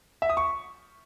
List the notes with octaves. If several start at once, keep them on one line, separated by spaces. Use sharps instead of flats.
E5
D#6
C#6